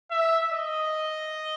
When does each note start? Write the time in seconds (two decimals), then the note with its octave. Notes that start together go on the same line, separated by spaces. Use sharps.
0.11 E5
0.52 D#5